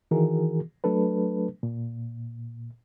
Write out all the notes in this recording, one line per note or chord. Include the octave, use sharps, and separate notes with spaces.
D#3 E3 F#4 G#4 A#4
F#3 A3 D4 A4 B4
A#2